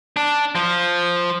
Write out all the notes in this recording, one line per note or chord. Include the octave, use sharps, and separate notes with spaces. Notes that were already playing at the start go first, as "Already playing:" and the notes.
D4
F3